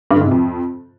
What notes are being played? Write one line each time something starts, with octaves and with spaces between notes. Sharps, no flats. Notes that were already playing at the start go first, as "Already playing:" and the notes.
G2
D3
G#2
C3
F2